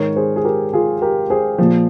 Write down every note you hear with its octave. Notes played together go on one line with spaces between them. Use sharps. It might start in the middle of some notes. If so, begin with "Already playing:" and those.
Already playing: G#2 D#3 A#4 C#5
G#4 C5
G#4
G4 A#4
F4 G#4
G4 A#4
G#4 C5
A#2 F3